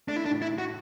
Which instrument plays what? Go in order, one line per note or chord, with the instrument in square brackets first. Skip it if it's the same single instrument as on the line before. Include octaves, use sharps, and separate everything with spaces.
[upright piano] A3 [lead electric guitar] D4
[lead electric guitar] E4
D4
[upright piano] A2
[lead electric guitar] E4
[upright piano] A2
[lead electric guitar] F#4